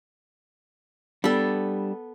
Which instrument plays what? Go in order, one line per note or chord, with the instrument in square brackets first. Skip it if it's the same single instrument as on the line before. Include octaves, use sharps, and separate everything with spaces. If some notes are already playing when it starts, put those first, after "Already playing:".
[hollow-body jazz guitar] G3 D4 [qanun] B3 A4